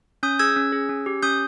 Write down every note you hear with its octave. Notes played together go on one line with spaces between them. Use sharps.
C#4 D#6 G6
G#4 E6 G#6
C#4
G#4
C#4
G4
C#4 D#6 G6